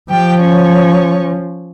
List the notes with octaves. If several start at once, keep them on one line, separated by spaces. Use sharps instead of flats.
F3 G4 G5
C#4 C#5